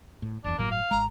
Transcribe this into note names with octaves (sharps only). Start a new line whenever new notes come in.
A2
F#1 E2 D4
G1 A2 F#3 A#3
F5
G#1 G#3 A#5